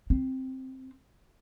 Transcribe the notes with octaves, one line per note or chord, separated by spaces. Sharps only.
C4